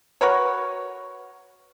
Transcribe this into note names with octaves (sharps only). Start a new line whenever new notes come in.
F#4 A#4 B4 C#5